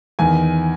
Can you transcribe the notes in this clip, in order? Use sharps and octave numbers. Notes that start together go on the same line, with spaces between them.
E2 D#3 G#5